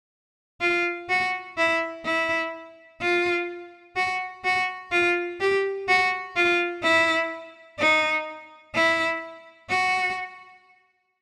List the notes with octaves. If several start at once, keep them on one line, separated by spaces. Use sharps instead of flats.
F4
F#4
E4
E4
F4
F#4
F#4
F4
G4
F#4
F4
E4
D#4
E4
F#4